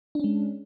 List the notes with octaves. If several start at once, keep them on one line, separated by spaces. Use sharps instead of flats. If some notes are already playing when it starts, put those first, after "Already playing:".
G#3 C#4 D4